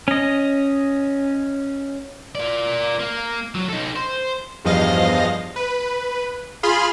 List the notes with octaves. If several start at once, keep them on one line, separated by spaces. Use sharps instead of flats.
C#4 D#5
A#4 D5
A#3
F#3
D#4 A4
C5
E2 G2 F3 D#5 F5 A#6
B4
F4 G#4 B5 C6 F6